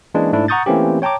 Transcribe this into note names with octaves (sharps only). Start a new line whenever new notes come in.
E3 G#3 A#3 C#4 D4
G#2 A3 D4 E4
F#5 A#5 C#6 D#6 G6 A6
E3 A3 A#3 C4 C#4 G4
C#5 G5 A5 A#5 D6